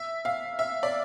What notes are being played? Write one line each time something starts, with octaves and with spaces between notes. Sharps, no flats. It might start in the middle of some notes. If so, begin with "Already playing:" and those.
Already playing: E5
F5
E5
D5